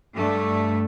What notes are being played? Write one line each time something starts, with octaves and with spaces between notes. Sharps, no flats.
G2 A3